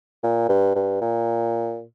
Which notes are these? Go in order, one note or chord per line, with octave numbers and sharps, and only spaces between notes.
A#2
G2
G2
A#2